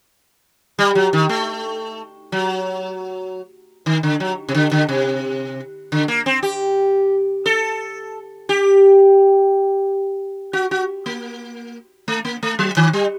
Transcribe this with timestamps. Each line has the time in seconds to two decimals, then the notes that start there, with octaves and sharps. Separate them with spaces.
0.79 G3
0.95 F#3
1.13 D#3
1.29 A3
2.32 F#3
3.86 D#3
4.03 D3
4.20 F#3
4.49 C3
4.55 D3
4.71 D3
4.89 C3
5.92 D3
6.08 A#3
6.26 C4
6.43 G4
7.46 A4
8.49 G4
10.53 F#4
10.71 F#4
11.06 A#3
12.08 A3
12.25 A#3
12.43 A3
12.59 F#3
12.77 D#3
12.93 G3